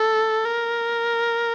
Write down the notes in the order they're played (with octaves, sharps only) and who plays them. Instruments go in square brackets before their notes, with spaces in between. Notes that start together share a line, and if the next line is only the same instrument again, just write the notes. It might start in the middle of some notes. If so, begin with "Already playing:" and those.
Already playing: [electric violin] A4
A#4